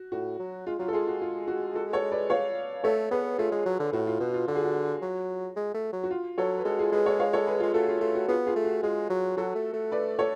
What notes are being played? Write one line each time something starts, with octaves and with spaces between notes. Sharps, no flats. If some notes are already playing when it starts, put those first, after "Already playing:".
Already playing: F#4
A2 F#4
F#3
G#3 F4
F#3 F4
A4
G#3 F4 G#4
F#4
F4
F#4
F#4 A4
A4 C#5
B4 D5
C#5 F5
A3 A4 C#5
B3 G#4 B4
A3 F4 G#4
G#3
F#3
D3
A2 F#4
F4
B2 F#4
F4
D3 F#4
G#4
F#4
F#3
G#3
A3
F#3
F#4
F4
F#3 A4 C#5
B4
G#3 F#4 A4
F4 G#4
G#3 G#4 B4
A4 C#5
C#5 F5
A4 C#5
G#4 B4
F4 G#4
G#3
A3 F#4 A4
F4 G#4
A3 F4
F#4
B3 F4 G#4
F4 G#4
A3
F#4
G#3 F4 G#4
F#3
F#3 F#4 A4
A3
A3
B4 D5
A4 C#5